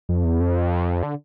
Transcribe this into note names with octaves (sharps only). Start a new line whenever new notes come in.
F2
E2
F2
D3